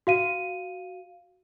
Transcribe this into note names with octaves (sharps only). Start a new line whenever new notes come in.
F#4 F5 D#7